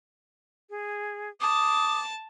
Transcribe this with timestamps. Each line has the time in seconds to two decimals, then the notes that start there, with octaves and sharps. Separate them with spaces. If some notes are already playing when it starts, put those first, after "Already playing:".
0.70 G#4
1.41 A5 D6 D#6